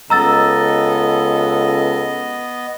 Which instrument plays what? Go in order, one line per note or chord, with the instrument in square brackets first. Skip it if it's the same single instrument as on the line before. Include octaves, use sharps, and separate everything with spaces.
[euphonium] C#2 [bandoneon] B3 D#5 [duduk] A4 [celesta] A#5 E6 A6